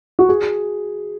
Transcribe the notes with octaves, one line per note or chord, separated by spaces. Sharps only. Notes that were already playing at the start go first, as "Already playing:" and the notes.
F#4
G#4